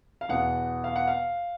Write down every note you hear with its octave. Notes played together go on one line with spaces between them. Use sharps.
F5
E2 B2 F#5
F5
F#5
F5